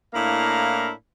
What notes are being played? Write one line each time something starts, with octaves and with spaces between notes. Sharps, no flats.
A2 A#3 D4 E4 F5 A#5